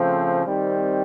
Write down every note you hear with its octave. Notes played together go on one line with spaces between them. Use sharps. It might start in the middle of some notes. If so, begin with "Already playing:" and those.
Already playing: C#3 F3 A3 C4
D#3 G3 C4